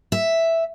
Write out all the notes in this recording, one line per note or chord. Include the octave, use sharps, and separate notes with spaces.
E5